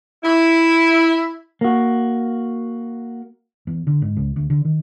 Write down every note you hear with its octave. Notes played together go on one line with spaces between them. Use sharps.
E4
A#3 F#4
E2
D3
G#2
C#2
D2
D3
D#3